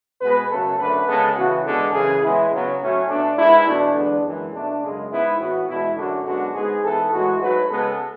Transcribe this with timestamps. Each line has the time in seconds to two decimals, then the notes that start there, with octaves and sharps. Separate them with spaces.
0.21 B2 G#3 B3 B4
0.50 F#2 C#3 F#3 A3 A4
0.79 F#2 D3 A3 B4
1.08 C#3 G#3 B3 A4
1.36 C#3 E3 B3 F#4
1.65 E2 D3 G#3 B3 A4
1.94 F#2 C#3 E3 G#4
2.23 A2 E3 G#3 B3 E4
2.51 C#3 F#3 B3
2.80 A2 F#3 A3 C#4
3.09 B2 A3 D4
3.38 G#2 G#3 B3 E4
3.66 E2 B2 A3 D4
3.95 E2 D3 G#3 B3
4.24 F#2 E3 G#3
4.53 B2 A3 D4
4.82 F#2 C#3 G#3
5.11 G#2 G#3 B3 E4
5.39 A2 E3 B3 F#4
5.69 E2 B2 G#3 E4
5.97 F#2 D3 A3 F#4
6.25 F#2 D3 G#3 B3 F#4
6.54 G#2 G#3 B3 G#4
6.83 G#2 E3 B3 A4
7.12 A2 E3 G#3 F#4
7.40 G#2 F#3 A3 B4
7.69 C#3 G#3 B3 A4